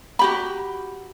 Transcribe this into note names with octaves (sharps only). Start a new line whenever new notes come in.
F#4 G4 B5